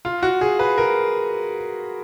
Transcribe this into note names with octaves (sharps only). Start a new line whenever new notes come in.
F4
F#4
G#4
B4
A#4